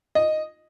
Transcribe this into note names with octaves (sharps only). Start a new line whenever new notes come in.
D#5